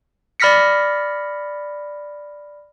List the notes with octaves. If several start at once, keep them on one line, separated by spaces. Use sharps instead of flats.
D5 B5 F6 A#6 B6 C#7